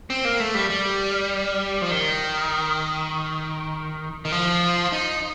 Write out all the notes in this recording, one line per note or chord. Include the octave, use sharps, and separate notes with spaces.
C4
A#3
A3
G3
G3
F3
D#3
D#3
F3
D#4